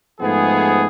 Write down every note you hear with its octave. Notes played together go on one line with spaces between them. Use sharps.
G#2 F3 A3 B3 G#4